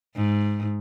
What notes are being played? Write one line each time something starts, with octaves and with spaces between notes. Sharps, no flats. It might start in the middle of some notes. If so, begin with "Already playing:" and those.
G#2